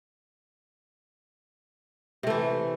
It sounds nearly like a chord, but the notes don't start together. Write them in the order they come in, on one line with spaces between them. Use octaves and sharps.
C3 A3 E3